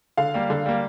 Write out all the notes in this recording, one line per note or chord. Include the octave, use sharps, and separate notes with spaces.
D3 F5
G3 A#3
D3
G3 A#3